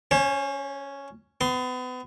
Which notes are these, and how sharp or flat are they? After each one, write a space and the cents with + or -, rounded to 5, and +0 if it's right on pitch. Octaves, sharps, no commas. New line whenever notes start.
C#4 +0 C5 +45
B3 +35 C6 +0